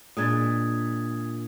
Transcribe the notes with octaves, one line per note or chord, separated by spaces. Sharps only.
A#2 G#3 D4 D#6 G#6 A6